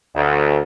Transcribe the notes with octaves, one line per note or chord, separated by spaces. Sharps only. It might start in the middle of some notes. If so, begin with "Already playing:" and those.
D2